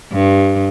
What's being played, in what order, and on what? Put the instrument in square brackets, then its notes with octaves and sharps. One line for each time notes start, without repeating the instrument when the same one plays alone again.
[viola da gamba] G2